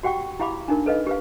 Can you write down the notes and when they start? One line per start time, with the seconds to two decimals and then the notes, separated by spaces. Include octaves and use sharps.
0.03 F#4 G4 F#5 G5 C#6
0.40 E4 G4 F5 B5 D6
0.68 D4 D#4 A#4
0.86 A4 B4 D#5 F5
1.07 G4 B4 F5